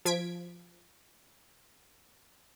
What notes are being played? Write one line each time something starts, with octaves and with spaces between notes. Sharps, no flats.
F3 G#6 B6 D7